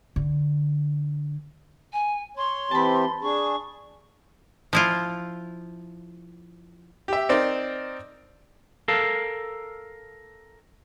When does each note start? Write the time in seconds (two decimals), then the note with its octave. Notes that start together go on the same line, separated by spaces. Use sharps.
0.16 D3
1.92 G#5
2.37 C#5 C6
2.71 E3 C4 G4 A5 B5
3.22 D4 G#4 C#6
4.73 F3 E4 F4
7.08 G4 E5
7.29 C4 D#4 A#4 C5 D5
8.88 A4 A#4 F5 A5